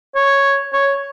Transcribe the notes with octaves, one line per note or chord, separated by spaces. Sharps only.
C#5
C#5